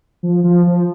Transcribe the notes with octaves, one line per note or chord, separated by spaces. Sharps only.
F3
F3
F3